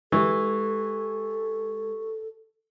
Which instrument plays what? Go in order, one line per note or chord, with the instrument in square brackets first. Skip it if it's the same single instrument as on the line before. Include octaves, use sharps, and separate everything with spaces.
[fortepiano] E3 [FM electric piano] G#3 [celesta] G4 C#6 [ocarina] A4